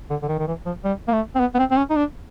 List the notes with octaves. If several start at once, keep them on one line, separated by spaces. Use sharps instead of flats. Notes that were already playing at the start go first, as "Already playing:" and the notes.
D3
D3
D#3
D#3
E3
F3
G3
A#3
A3
C4
B3
B3
C4
C4
C#4
D#4
D4